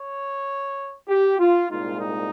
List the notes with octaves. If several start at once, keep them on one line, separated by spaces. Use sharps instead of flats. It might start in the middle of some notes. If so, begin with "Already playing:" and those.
Already playing: C#5
G4
F4
C2 A#2 G#3 D#4 F4
D#4